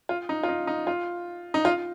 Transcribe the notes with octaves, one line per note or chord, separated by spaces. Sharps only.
F4
D#4
F4
D#4
D#4
F4
D#4
F4